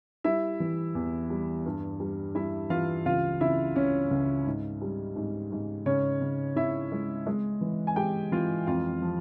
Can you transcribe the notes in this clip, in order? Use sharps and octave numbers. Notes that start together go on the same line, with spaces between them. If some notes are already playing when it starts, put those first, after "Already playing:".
G3 E4 E5
E3
E2
G3
G2
G3
G3 E4 E5
E3 F4 F5
C#2 F4 F5
C#3 E4 E5
C#2 C#4 C#5
C#2
G#2
G3
G#2
G#2
C#3 C#4 C#5
C#3
C#3 E4 E5
G#3
G#3
E3
G#5
G#3 G4 G5
E3 F4 F5
F2 F4 F5
F3